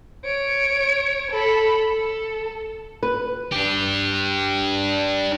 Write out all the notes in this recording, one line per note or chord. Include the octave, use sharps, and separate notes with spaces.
C#5 D7
A4 B5
A4
B4
D4 G4